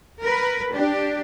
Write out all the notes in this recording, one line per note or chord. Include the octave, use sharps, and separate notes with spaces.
A#4 B4
D4 G4